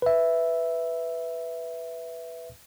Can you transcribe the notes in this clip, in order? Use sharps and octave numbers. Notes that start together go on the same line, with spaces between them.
B4 E5